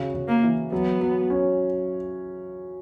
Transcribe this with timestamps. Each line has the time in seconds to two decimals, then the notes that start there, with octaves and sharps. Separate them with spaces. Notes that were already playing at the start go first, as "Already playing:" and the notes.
Already playing: C#3 F#4
0.14 C#3
0.28 A#3
0.43 E3
0.72 F#3 B3
1.01 F#3
1.30 C#4